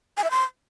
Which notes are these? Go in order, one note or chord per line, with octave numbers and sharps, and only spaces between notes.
G#5
E5
C6